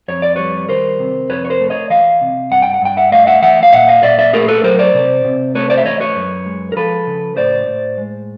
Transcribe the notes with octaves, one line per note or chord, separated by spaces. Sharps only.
F2 C#5
D5
G3 B4 C#5
D#3 A#4 C5
C3
F2 B4 C#5
C#5
A#4 C5
A3
C#5 D#5
E3 D#5 F5
C3
G2 F#5
G5
F#5
G2 G5
E5 F#5
A3 D#5 F5
E5 F#5
E3 E5 F#5
F5
A#2 E5 F#5
D#5 F5
A#2 D5 E5
D5 E5
A3 G#4 A#4
A4 B4
F#3 A#4 C5
C5 D5
C3
C3
A3 B4 C#5
C5 D5
E5
E3 C#5 D#5
B4 C#5
F#2
G#3
A#4
F3 A4 B4
C#3
A2 C5 D5
A2
G#3